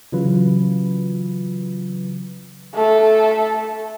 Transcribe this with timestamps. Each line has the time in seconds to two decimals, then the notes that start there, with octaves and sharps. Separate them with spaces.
0.12 C#3 E3 F#3 F4 B4
2.75 A3 A4